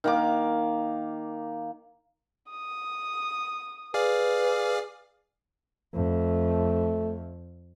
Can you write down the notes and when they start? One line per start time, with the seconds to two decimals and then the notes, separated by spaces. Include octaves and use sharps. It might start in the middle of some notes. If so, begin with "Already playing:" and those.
0.04 D#3 A#3 D6
2.50 D#6
3.94 G#4 B4 D5 F5
5.94 F2 A3